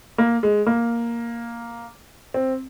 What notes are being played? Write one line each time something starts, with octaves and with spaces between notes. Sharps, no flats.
A#3
G#3
A#3
C4